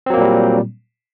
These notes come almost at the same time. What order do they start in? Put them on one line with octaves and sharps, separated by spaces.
C4 F#3 A#3 A#2 G3